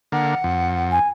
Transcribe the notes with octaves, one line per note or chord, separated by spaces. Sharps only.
D3 A#3 F#5
F2
G#5